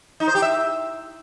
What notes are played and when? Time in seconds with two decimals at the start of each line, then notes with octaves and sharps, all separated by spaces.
0.20 D#4
0.28 C5
0.35 G4
0.42 E5